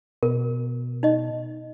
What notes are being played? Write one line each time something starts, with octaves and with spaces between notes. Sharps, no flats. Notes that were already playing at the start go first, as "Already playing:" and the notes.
B2 A#4
D#4 D#5